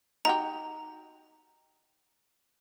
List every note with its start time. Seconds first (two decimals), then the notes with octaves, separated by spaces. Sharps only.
0.25 D#4 F#4 G4 A#5